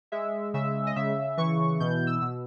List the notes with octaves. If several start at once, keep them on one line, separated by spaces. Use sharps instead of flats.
G#3 E5
C#3 E5
D#5
C#3 E5
E3 C#6
B2 G6
E6
B2